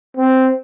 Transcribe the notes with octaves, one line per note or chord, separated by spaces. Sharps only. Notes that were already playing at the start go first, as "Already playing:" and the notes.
C4